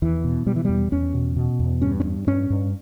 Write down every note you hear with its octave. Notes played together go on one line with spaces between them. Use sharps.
E2 E3
B2
B2 G3
E3
E2 G3
E2 C#4
B2
B2
E2
G2 C#4
C#4
G2
G2 C#4
G2